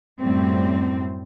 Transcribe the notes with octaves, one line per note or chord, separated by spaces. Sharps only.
F#2 A2 G3 C4